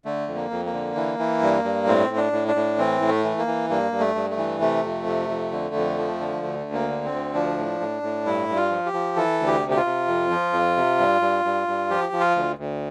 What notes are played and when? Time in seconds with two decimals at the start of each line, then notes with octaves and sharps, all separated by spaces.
0.05 D3 A3
0.27 F2
0.35 A#3
0.51 F2
0.65 A#3
0.73 D3
0.96 E3
1.19 E3
1.42 G2
1.64 G2
1.87 A2 C4
2.10 A2
2.17 D4
2.32 A2
2.48 D4
2.55 A2
2.78 E3 C4
3.01 A2
3.09 A3
3.24 E3
3.39 A#3
3.47 E3
3.69 G2 A#3
3.92 G2
4.00 A3
4.15 G2
4.30 A3
4.37 E3
4.61 C3 A3
4.84 F2
5.06 C3
5.29 F2
5.51 D3
5.75 F2
5.98 F3
6.20 D3
6.43 D2 A3
6.66 D2
6.73 A#3
6.88 D3
7.04 C4
7.12 D2
7.34 F3 D4
7.57 A2
7.80 A2
8.03 A2
8.25 G2 E4
8.49 G2
8.56 F4
8.71 F3
8.86 G4
8.93 F3
9.16 E3 A4
9.40 D2
9.46 G4
9.62 C3
9.71 G4
9.77 F4
9.85 C3
10.07 F2
10.31 F3
10.53 F2
10.76 C3
10.99 G2
11.21 G2
11.45 G2
11.68 G2
11.90 F3 G4
12.13 F3
12.20 F4
12.36 D2
12.58 D2